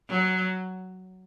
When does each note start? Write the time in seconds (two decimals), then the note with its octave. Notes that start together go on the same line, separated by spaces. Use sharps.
0.09 F#3